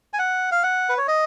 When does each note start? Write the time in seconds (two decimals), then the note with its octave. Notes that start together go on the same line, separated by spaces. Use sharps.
0.13 G#5
0.19 F#5
0.52 F5
0.63 F#5
0.89 B4
0.98 C#5
1.08 D#5